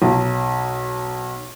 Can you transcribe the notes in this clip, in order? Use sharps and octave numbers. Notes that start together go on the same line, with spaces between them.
B1